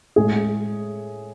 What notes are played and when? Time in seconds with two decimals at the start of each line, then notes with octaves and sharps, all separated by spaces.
0.16 A2 G#3 G#4